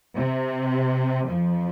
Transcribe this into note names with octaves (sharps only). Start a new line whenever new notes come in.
C3
F2 F3